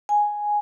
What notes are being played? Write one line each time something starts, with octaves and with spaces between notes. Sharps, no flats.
G#5